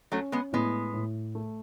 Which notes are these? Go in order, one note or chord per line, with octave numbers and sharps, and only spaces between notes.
F#3 A3 C#4
G#3 B3
A2 G#3 B3
A2
A3